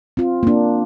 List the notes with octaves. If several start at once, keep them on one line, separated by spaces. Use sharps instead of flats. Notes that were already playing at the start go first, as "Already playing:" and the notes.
C4 F4
A#3 D4